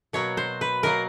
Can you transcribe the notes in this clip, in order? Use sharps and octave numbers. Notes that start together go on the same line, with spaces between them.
B2 F#3 A#3 C#5
C5
B4
B2 F#3 A#3 A#4